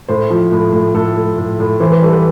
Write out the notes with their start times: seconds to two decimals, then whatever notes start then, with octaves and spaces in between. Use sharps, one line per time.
0.08 A2 C5
0.30 F3
0.52 A2
0.73 A2
0.94 A2 A4
1.16 A2
1.38 A2
1.60 A2
1.80 E3 C5
1.92 B4
2.02 G3 A4
2.13 B4